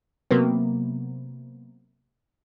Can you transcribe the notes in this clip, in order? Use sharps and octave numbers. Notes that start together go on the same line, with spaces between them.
C3 F#3 A#3 B3